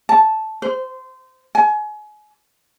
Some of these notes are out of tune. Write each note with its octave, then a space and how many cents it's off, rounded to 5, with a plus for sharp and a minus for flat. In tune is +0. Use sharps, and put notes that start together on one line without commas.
A5 -10
C5 -20
G#5 +30